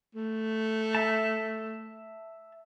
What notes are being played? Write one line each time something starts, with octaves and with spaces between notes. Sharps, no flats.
A3
E5 A5